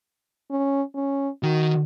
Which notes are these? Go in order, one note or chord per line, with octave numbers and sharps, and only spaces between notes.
C#4
C#4
D#3 F#4